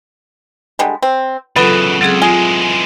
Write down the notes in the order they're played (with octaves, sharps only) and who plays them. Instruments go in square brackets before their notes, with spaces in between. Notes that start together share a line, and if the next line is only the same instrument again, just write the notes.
[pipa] D3 G3 G#3
C4
[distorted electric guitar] C#3 E3 [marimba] F#3 F4 A4 [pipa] B3
[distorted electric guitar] C#2 [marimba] F#3 C4 G#4
[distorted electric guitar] E3 G#3 [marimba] F4 [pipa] G#4